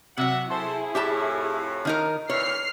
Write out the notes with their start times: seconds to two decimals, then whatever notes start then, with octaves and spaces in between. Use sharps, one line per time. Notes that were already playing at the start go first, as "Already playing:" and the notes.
0.18 C3 F#3 F#4 E5 F#5
0.51 E4 G#4 A4 C5
0.95 F2 A2 G4 E5 A5
1.85 D#3 D#4 A#4
2.30 D2 E3 C#5 F6 C7